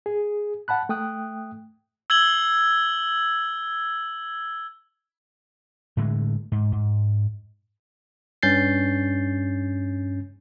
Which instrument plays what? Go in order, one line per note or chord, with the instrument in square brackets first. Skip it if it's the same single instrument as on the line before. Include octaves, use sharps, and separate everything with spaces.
[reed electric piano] G#4
F#5 A5 B5 F#6
A3 G5 D#6 F#6
[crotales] E6 G#6 F#7 G7
[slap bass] A2 D3 G#3
G#2
G#2
[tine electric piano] G2 C#4 G6 A6 C7